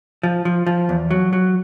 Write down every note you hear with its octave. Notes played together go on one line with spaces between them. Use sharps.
F3
F3
F3
E2
F#3
F#3